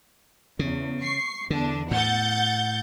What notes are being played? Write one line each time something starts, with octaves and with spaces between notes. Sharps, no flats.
E2 C#3
C#6 C7
E2 D3 D4
A2 F#5 G6 A6